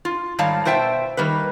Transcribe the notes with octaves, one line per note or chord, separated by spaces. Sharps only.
F4
G#2 D#3 G3 C#5 F5 A5
B2 F4 C5 E5 G5 A5
D#3 G3 A#3 B4